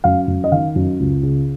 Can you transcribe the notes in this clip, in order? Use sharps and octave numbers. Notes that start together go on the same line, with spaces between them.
F#2 F5
F#2
D#5
D#3 F5
F#2
C#2
C#3